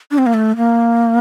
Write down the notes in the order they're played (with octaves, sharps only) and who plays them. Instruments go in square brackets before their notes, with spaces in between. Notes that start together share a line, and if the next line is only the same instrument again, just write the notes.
[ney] D4
C4
A#3
A3
A#3